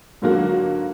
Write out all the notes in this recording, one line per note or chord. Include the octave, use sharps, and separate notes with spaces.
G#2 D3 F#3 A#3 F4 F#4